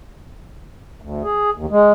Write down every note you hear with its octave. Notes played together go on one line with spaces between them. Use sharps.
D2
G#4
D#2
G#3